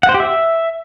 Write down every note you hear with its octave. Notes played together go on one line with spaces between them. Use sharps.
F#5
C5
G4
E5